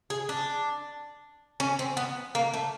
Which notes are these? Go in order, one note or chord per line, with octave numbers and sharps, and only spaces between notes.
G#4
D4
C#4
C4
B3
A#3
A3